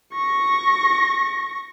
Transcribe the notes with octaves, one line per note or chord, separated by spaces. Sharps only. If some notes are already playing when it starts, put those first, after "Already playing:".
C#6 A#6